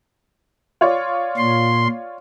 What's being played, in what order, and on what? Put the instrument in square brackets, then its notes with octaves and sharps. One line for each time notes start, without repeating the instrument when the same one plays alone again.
[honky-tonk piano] F4 C#5 D5
[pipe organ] A#2 C6